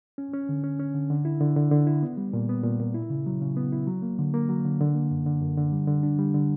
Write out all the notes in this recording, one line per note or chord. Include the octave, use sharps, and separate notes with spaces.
C#4
C#4
D3
C#4
C#4
D3
D3
E4
D3
D3
D3
E4
B3
G3
A#2
B3
A#2
A#2
E4
C#3
F#3
C#3
B3
E4
F#3
A#3
D3
A#3
F#3
D3
D3
A#3
F#2
D3
F#2
D3
G3
D3
D4
G3
D3